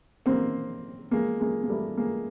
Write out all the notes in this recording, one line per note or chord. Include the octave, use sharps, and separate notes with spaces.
A#3 C4
G#3 A#3
G#3 A#3
A#3
G3 A3
G#3 A#3